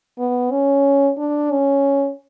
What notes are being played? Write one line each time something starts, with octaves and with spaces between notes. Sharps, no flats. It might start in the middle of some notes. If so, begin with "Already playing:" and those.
B3
C#4
D4
C#4